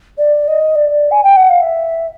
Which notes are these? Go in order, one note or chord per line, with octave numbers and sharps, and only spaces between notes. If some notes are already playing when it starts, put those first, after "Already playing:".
D5
D#5
D5
G#5
G5
F#5
F5
E5